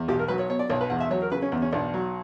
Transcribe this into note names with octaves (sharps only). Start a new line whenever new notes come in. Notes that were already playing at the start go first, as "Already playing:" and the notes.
Already playing: E2
B1 G4
A#4
F#3 B4
C#5
B2 C#5
D5
B1 C#5
B4
E2 F#5
E5
F#3 C#5
A#4
C#3 B4
C#4
E2 B3
C#4
B1 D4
F#3